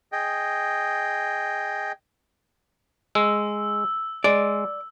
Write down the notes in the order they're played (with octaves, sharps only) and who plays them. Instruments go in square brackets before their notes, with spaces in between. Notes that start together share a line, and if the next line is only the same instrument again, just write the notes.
[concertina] G#4 D#5 G5
[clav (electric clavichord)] G#3 [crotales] E6
[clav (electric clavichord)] G#3 [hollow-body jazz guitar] D5